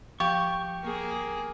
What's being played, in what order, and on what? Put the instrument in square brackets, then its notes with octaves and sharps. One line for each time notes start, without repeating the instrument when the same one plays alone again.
[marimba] F3 [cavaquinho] G4 [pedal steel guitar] C#6
[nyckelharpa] A#3 G#4